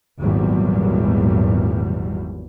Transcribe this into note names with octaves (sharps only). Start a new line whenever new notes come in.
G#1 E2 A#2 F#3 G3